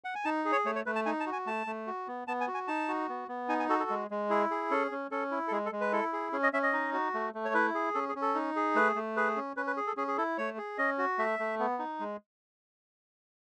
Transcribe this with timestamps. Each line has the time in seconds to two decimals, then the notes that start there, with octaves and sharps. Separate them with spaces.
0.04 F#5
0.15 G#5
0.25 D#4 A5
0.45 G#4
0.52 C#5
0.65 A3 C#5
0.76 C#5
0.86 A3 B4
0.95 A5
1.05 D#4 G#5
1.20 A5
1.26 F#4
1.33 G#5
1.46 A3 A5
1.67 A3
1.87 F#4
2.07 B3
2.28 B3 A5
2.41 G#5
2.48 F#4
2.54 G#5
2.68 D#4 A5
2.88 F#4
3.09 B3
3.28 B3
3.49 D#4 G#5
3.60 G#5
3.69 F#4 A4
3.80 A4
3.90 G#3
4.11 G#3
4.30 E4 G#4
4.51 G#4
4.71 C#4 A4
4.92 C#4
5.11 C#4 A4
5.31 E4
5.48 A4
5.51 G#3 G#4
5.66 A4
5.72 G#3
5.81 B4
5.92 E4 A4
6.13 G#4
6.32 C#4 G#4
6.43 D#5
6.53 C#4 E5
6.63 D#5
6.73 D#4
6.93 F#4
7.14 A3
7.34 A3
7.45 C#5
7.54 E4 B4
7.74 G#4
7.94 C#4 A4
8.09 G#4
8.16 C#4
8.22 A4
8.35 D#4
8.56 G#4
8.75 A3 B4
8.96 A3
9.16 G#4 B4
9.36 C#4
9.57 C#4 B4
9.67 B4
9.77 G#4
9.87 A4
9.97 C#4 G#4
10.08 G#4
10.17 E4 A4
10.38 A3 C#5
10.58 G#4
10.78 C#4 D#5
10.98 F#4
11.18 A3 E5
11.39 A3
11.59 B3
11.79 D#4
12.00 G#3